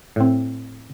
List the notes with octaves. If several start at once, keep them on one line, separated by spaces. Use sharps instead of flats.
A2 C4